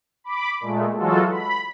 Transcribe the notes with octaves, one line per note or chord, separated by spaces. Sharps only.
B5 D6
A#2 G#3 A3
E3 F#3 G#3 F4 F#4 A4
B5